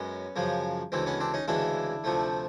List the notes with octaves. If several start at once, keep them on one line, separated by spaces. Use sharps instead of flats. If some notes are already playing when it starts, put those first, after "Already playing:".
Already playing: F#2 G#3 B3 C#4
F#2 C#3 F3 G#3
D2 C#3 E3 G#3 C4
B3 C#4
C4 D4
C#4 D#4
D2 C#3 E3 G#3 D4 E4
D2 C3 F3 A3